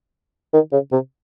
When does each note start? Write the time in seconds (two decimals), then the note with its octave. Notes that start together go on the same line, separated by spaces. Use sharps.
0.53 D#3
0.72 C#3
0.92 C3